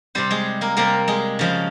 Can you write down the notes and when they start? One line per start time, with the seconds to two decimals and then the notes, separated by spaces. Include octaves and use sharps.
0.15 C3 G3 C4 C5
0.31 G#3 G#4
0.61 A#3 A#4
0.77 C3 G3 A#3 A#4
1.08 G#3 G#4
1.39 C#3 F3 G#3